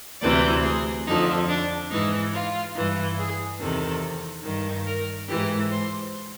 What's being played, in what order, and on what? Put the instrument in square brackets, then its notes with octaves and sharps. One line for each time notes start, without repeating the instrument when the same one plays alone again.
[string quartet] D2 C3 E3 D5
G#4
F2 D3 F3 D#4
D4
G#2 E3 D#4
F4
G2 E3
G#4
E2 C3 D#3 A4
G2 D#3
A#4
G#2 E3 G4
C5